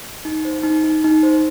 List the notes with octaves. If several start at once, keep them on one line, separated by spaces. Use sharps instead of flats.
D#4
C5
D#4
D#4
D#4
C5